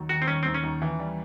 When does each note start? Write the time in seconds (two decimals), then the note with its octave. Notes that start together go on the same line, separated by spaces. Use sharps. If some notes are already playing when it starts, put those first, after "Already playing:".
Already playing: D#2 F#3
0.09 D#3 F#4
0.22 C4
0.28 D#2 C#4
0.43 D#2 C4
0.54 C#4
0.63 D#2
0.82 E3
0.99 G3